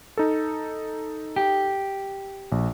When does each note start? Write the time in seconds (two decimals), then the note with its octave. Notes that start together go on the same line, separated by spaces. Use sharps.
0.17 D#4 A4
1.36 G4
2.52 A#1